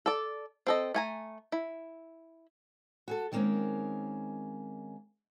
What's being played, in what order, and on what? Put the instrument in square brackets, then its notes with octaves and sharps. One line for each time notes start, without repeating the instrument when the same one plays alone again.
[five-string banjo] A4 D5
C4 A4 D#5
A3 G#5 A#5
E4
[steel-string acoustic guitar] F#4 G#4 A4
D#3 G3 G#3 A#3 C4 C#4